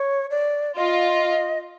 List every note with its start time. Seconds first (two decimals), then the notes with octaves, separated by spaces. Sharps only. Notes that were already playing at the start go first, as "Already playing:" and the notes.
Already playing: C#5
0.31 D5
0.76 F4 D#5